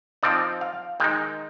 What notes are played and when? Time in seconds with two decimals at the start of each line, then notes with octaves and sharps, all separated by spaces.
0.23 F3 C4 D#4 D5
0.61 F5
1.00 D#3 G#3 D#4 G5